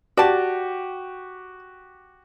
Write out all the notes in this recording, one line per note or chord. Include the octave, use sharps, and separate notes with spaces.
F#4 G4 D5 A5